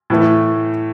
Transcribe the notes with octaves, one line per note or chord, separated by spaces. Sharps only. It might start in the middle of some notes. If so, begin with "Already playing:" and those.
A2 E3 A3